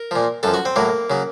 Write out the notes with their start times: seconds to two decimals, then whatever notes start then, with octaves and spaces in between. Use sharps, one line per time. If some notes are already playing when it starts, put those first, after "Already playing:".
Already playing: A#4
0.11 A#2 F3
0.43 F#2 F3 A4
0.54 F#4
0.65 C4
0.76 A2 F#3 A#3
1.10 C#3 F#3